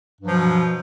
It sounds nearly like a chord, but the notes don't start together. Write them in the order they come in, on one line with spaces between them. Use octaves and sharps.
G2 F#3 F3 B2